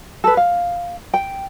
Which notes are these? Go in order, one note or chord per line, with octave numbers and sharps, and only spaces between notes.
A4 B4
F5
G5